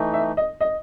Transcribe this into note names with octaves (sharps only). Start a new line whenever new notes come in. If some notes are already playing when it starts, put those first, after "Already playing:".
Already playing: E3 A3 D#4
E5
D#5
D#5